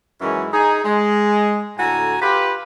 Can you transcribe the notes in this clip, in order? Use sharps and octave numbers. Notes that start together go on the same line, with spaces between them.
F#2 D#3 E3 G#3 C#4 E4
D#4 G#4
G#3
A2 D3 F#4 A4 G#5 A#5
F4 G4 B4